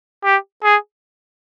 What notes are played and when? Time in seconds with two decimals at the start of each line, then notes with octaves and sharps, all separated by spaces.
0.24 G4
0.64 G#4